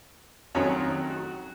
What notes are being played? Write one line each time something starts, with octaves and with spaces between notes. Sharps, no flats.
F2 D#3 F#3 C#4
F#4